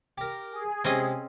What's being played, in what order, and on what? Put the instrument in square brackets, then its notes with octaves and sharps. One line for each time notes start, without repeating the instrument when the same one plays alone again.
[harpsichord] G4 A#4
[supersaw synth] G#4
[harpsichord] C3 G#3 [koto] C4 C#4 D#5